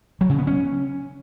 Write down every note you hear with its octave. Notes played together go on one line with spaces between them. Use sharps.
F#3
C#3
B3
C#4